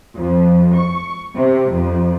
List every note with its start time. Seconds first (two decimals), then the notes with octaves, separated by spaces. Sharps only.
0.17 F2
0.76 C#6
1.35 C3
1.70 F2